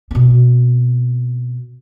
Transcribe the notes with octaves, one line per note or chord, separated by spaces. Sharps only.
B2 C4